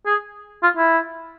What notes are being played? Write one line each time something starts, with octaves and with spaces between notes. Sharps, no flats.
G#4
F4
E4